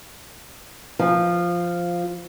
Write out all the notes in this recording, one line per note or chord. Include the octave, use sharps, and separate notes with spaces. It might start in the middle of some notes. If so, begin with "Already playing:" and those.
F3